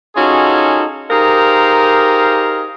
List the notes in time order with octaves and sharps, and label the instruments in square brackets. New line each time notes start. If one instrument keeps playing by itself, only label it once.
[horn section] C#4 D#4 F4 F#4 G#4 A4
D#4 G4 G#4 A#4 C5 F5